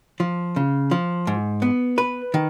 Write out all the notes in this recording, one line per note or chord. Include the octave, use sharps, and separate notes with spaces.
F3
C#3
F3
G#2
B3
B4
D#3